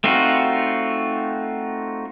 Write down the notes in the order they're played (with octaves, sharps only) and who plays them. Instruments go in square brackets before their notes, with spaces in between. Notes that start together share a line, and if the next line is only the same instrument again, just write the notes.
[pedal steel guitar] A3 C4 D#4 F4 F#4